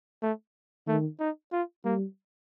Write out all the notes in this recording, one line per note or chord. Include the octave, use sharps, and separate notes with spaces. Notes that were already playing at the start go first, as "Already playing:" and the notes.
A3
D#3 A3
D#4
F4
G3 A#3